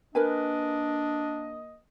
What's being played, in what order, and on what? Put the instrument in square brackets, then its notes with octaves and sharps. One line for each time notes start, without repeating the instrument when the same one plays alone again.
[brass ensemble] A#3 D#5 [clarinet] D4 [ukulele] A#4 B4 G#5